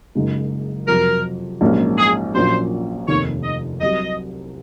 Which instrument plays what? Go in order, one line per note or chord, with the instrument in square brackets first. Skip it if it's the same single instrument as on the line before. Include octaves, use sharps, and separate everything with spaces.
[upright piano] F#1 F#2 C#3 G#3 D#4
[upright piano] F2 C3 F#3 [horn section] A#4
[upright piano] A#1 G#2 F#3 A#3 C#4
[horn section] G#4
[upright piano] A#1 A#2 F#3 C#4 [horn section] C5
[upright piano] F1 D#2 D#3 [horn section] C#5
[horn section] D#5
[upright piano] C2 C3 F#3 [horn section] D#5